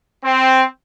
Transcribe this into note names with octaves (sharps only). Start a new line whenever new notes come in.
C4